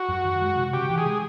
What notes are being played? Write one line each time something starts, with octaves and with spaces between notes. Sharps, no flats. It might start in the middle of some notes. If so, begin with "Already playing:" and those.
Already playing: F#4
F#2
D#3
G#3
C3
C#3 G4
E3
G#4
G#3